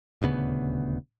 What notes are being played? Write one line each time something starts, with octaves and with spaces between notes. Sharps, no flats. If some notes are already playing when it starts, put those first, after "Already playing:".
D#1 D2 C#3 B3